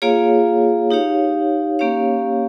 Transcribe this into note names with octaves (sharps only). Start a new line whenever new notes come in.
A#3 F4 G#4 C#5 F5
D#4 G4 C#5 F5
A#3 C#4 G4 C#5 F5